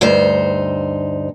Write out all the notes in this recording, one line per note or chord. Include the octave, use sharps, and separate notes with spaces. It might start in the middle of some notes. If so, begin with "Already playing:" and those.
D2 G2 D#4 C5